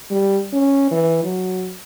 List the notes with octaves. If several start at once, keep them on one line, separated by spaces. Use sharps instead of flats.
G3
C#4
E3
F#3